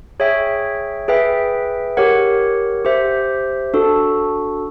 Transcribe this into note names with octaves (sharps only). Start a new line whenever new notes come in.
G#4 C#5 E5 G5
G#4 B4 E5 G5
G4 A#4 C#5 F#5
G4 C5 E5
D4 F#4 A4